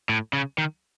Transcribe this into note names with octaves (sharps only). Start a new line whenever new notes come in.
A2
C#3
D#3